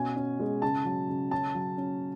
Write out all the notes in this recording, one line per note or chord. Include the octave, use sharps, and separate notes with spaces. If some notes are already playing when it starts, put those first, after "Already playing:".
Already playing: B2 C#4 G#5
C#4
G#3
C#3 A5
F#3
C#3
C#4 A5
F#3
C#4